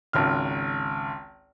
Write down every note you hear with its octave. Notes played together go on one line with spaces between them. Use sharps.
G#1 C#2 F6